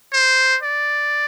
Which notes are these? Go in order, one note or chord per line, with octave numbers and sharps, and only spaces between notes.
C5
D5